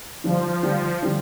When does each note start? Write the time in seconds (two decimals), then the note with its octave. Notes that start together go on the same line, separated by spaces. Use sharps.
0.24 D3 F3 G3 D4
0.63 D3 G3 D4
1.02 D3 G3 D4